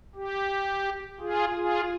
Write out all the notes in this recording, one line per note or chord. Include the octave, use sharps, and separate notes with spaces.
G4
F4 G#4
F4 G#4